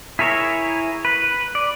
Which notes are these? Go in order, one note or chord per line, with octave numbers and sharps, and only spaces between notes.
E4 G#4 A#4 C#5 E5
B4
D5